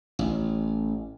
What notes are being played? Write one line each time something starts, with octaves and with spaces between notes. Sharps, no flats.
A1